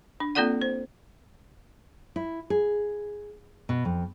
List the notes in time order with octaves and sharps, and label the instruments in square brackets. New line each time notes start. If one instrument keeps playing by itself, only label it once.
[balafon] D4
A#3 C4 F4 A4 D5 F#5
C5
[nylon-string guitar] E4
G#4
B2
F2